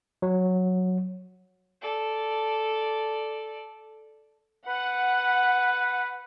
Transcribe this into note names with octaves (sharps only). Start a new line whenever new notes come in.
F#3
A4 D5
B4 F#5